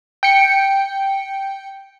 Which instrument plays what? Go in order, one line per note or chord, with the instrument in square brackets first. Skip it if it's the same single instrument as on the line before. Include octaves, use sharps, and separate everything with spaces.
[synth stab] G5 C#7